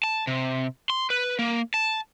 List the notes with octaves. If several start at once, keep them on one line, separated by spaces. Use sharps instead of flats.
A5
C3
C6
B4
A#3
A5